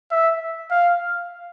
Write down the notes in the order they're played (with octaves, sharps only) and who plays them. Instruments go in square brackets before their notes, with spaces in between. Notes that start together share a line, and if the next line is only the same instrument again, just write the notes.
[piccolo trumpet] E5
F5